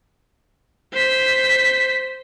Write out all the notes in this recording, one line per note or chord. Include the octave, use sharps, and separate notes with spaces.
C5 B6